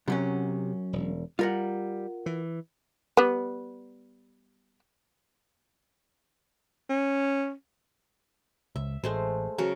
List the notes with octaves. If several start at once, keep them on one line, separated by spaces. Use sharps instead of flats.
F#2 C3 F#3 C#4
E1
G3 F4 A#4 F#5
E3
G3 B3
C#4
C#2 E5
A1 G#3 A3 C5
C#3 F#3 A#4